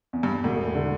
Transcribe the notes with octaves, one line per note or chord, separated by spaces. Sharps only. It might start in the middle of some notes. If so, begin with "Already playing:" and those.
E2
G2
E1 A2
D3